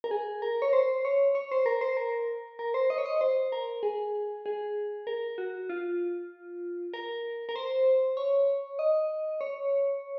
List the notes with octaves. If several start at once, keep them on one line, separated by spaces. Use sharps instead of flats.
A#4
G#4
A#4
C#5
C5
C#5
C#5
C5
A#4
C5
A#4
A#4
C5
D#5
C#5
D#5
C5
A#4
G#4
G#4
A#4
F#4
F4
A#4
A#4
C5
C#5
D#5
C#5